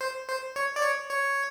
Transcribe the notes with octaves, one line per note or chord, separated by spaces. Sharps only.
C5
C5
C#5
D5
C#5
C#5